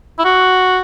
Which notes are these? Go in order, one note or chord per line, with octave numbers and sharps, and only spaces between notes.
E4
F#4